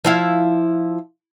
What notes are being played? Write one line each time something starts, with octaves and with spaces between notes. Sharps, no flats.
F3 E4 F5